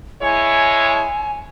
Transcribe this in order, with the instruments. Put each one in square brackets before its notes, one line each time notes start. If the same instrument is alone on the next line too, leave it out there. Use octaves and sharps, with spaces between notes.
[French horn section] G#3 E4 C#5 [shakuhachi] G#5